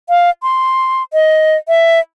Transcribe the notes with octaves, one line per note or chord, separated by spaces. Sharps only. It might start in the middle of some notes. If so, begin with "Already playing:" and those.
F5
C6
D#5
E5